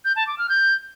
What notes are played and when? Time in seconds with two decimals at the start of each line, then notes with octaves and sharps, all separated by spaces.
0.05 G6
0.16 A5
0.27 D6
0.38 F6
0.49 G6